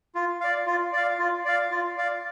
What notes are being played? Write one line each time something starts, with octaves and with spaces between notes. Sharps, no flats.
F4
D5 F5
F4
D5 F5
F4
D5 F5
F4
D5 F5